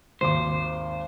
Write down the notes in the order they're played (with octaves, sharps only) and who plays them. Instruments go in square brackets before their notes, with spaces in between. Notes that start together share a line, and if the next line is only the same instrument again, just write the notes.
[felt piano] G#1 D#2 D6 [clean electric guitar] C5